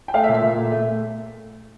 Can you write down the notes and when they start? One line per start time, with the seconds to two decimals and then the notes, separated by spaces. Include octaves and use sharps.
0.08 G5
0.14 A3 F5
0.23 E5
0.29 A#2
0.34 E5
0.43 A#2
0.58 A3
0.71 A3